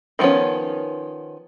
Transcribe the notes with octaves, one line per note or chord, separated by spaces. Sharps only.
D#3 F3 A#3 B3 C#4